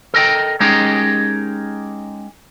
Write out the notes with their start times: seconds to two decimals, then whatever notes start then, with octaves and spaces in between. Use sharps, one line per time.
0.14 A4 A#4 D#5 G5
0.60 G#3 C#4 D#4 G4 G#4 A#4